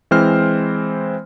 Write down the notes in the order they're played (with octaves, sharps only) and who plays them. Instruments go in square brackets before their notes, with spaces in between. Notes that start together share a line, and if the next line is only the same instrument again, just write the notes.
[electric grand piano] E3 G#3 C4 C5 F6